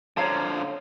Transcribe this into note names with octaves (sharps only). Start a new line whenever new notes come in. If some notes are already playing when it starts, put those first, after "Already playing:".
D3 F3 C#5 F5 A#5